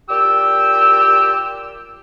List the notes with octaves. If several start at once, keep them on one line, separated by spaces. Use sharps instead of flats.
A#2 G4 E6